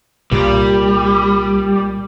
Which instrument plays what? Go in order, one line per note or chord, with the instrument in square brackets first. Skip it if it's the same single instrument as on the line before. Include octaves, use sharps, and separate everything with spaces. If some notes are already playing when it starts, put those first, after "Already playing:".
[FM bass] C2 [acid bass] A#2 [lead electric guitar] G3